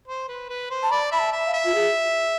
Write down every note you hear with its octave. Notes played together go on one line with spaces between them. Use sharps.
C5
B4
B4
C5
A5
D5 B5
E5 B5
A5
E5
F5
E5
F4
G#4